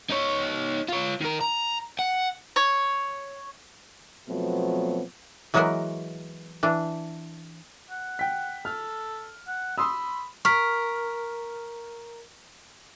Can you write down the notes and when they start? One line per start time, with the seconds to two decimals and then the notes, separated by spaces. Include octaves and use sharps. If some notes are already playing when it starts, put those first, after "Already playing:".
0.11 D#4 C#5
0.88 F4 C#5
1.21 D#3 A#4
1.41 A#5
1.99 F#5
2.56 C#5
4.28 B2 F3 F#3 A3 B3 C4
5.54 E3 F#3 G#3 B3 F#4 A#4
6.63 E3 D4
7.90 F#5
8.19 G5 B6
8.65 A4 F6
9.48 F#5
9.78 B5 C6 D#6 E6
10.45 A#4 C#6 F6 B6